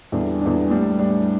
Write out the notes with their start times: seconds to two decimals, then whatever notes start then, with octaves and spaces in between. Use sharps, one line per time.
0.12 E2 D3 G3 D4
0.41 E2 D3 G3 D4
0.70 A2 G3 D4
0.99 A2 G3 D4